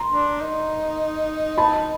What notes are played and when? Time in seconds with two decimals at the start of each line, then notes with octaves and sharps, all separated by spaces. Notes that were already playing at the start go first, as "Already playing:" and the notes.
Already playing: A#5 C6
0.11 D4
0.41 D#4
1.58 A5 B5